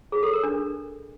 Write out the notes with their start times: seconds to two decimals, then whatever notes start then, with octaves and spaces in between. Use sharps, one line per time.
0.12 G#4
0.23 A4
0.33 A#4
0.43 D4